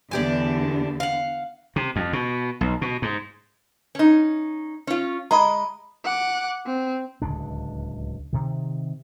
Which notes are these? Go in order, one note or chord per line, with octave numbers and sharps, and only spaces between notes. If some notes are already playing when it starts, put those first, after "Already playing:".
E2 D3 D4 G4 G#5
F5 F#5
C3
F2
B2
B1
B2
G#2
C#4 D#4
C#4 F4
G#3 D#5 A#5 B5
F#5 D6
C4
D1 C#2 D3 D4
C3 D#3